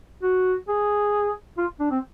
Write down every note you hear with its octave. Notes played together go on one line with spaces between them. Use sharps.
F#4
G#4
F4
D4
C4